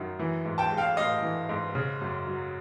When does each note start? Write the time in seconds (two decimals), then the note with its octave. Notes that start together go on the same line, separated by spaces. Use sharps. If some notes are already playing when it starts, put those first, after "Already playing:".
Already playing: F#2 D#3
0.19 E3
0.45 G#2
0.58 G5 A5
0.71 G#3
0.77 F5 G5
0.97 A1 D#5 F5
1.22 E3
1.49 G#2
1.75 C#3
2.01 F#2
2.27 F#3